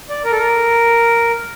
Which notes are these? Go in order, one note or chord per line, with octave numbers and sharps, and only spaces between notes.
D5
A#4
A4
A#4